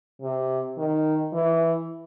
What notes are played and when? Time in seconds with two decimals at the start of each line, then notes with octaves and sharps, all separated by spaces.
0.21 C3
0.77 D#3
1.33 E3